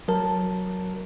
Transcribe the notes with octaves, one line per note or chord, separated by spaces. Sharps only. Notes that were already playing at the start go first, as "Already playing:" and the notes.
F#3 A#4 A5